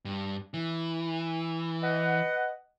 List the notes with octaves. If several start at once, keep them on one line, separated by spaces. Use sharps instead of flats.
G2
E3
B4 D#5 F#5